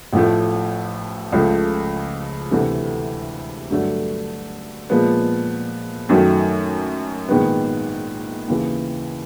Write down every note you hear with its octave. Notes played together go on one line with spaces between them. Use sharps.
A1 A2 F3 A3
C#2 C#3 F3 A3
D2 C3 E3 A3
G2 D3 F#3 A3 D4
A#2 F3 G#3 B3
F#2 D#3 F#3 A3
A#1 G#2 D#3 G#3 B3
D#2 C#3 E3